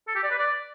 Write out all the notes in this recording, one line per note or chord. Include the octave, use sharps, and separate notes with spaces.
A4
G4
D5
B4
D5